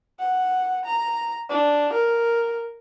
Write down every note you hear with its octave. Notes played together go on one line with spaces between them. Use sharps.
F#5
A#5
D4
A#4